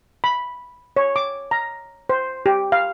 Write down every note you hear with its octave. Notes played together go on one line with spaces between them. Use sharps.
B5
C#5
D6
A#5
C5
G4
F5